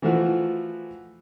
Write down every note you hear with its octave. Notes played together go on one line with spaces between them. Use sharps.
E3 F3 A3 F4 F#4